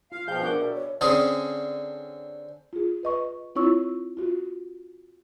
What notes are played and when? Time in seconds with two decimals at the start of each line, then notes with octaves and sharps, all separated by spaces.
0.12 F4 F5
0.28 B2 F3 G#4 F5 G5 G6
0.42 D4 A#4 F#5 D6
0.60 B2 F#4 D5 E5
0.75 C#5
1.01 D3 C4 C#4 G#4
2.73 F4 G#4
3.03 B4 D#5 C#6
3.55 C4 E4 F4 C#5 C#6 E6
4.17 F4 F#4